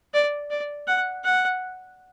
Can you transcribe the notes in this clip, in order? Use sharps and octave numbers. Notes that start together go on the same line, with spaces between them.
D5
D5
F#5
F#5